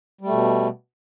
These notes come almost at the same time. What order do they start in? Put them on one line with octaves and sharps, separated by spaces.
G3 A3 B2